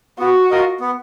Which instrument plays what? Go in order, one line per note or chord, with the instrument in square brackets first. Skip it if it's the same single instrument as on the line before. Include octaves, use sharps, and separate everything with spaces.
[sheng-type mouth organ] B3 [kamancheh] F#4
[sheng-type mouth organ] F4 A#4 D#5
B3